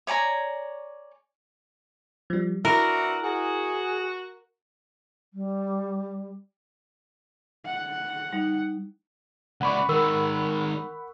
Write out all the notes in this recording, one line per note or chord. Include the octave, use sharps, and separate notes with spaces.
C#5 D5 G#5 A#5
F3 G3
E3 D4 E4 F#4 A#4
F#4 G#4
G3
F#5
G3 D#4
C#2 D5 F#5 B5 C#6
D#3 G#3 A#4 E6